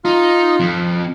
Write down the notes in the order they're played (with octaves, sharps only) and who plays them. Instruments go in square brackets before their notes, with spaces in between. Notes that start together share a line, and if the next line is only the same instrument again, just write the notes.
[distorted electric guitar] D#4 [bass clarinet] F4
[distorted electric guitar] F2